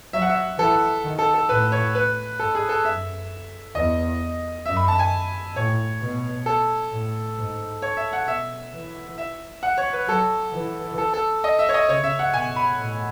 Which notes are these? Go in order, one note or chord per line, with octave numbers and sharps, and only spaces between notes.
F#3 E5
F#5
E5
E3 A4
D#3
A4
A4
A2 B4
C#5
B4
G#2 A4
G#4
A4
F#2 E5
E2 D#5
F#2 E5
B5
A5
G#5
A2 C#5
B2
A4
A2
G#2
C#5
E5
F#5
B2 E5
E3
E5
F#5
C#5
B4
F#3 A4
E3
A4
A4
D#5
E5
C#5
D#5
C#3 C#5
E5
F#5
B2 G#5
B5
A2